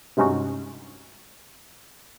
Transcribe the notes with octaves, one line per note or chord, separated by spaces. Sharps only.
G2 C3 G#3 C#4 D#4 F#4